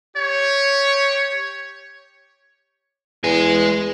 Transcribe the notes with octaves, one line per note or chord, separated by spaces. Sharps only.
G4 C#5
E2 G#3 G#5